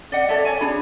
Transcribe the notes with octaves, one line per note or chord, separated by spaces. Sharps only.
D5 D#5 F#5
A4 C#5 D5 E5
C#5 G#5
D4 F#4 G#4 B5